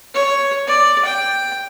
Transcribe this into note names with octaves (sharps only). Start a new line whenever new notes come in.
C#5
D5
G5